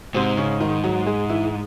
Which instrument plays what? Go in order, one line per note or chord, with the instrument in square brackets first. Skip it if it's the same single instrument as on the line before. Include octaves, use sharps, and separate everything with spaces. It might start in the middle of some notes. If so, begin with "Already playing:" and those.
[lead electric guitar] G#2 [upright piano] C3 C4
[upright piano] C#3 C#4
D#3 D#4
F#3 F#4
G#3 G#4
E3 E4